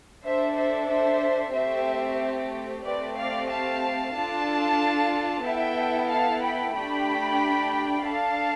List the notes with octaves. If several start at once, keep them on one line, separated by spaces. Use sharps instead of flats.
D4 A4 C5 E5
C5 E5
C5 E5
A3 C4 G4 C5 E5
A3 C4 G4 B4 D5
D5 F5
F5 A5
D4 F4 A4 F5 A5
B3 E4 A4 E5 G5
F5 A5
G5 B5
A3 D4 G4 G5 B5
D4 A4 F5 A5